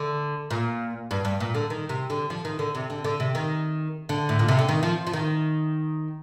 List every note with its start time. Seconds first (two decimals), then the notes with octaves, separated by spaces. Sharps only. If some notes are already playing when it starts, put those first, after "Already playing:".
Already playing: D3
0.51 A#2
1.11 G2
1.25 G2
1.40 A#2
1.55 D3
1.70 D#3
1.89 C3
2.10 D3
2.30 F3
2.45 D#3
2.59 D3
2.75 C3
2.90 D3
3.04 D3
3.20 C3
3.35 D#3
4.09 D3
4.29 A2
4.39 A#2
4.48 C3
4.59 D3
4.69 D#3
4.83 F3
5.07 F3
5.13 D#3